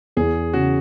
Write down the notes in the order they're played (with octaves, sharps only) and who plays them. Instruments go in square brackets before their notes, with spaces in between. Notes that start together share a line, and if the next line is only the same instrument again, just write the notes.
[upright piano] E2 [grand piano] G#4
[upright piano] C#3 [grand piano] F#4